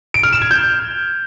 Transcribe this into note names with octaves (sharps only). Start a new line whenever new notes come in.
D7
F6
E7
G#6
G6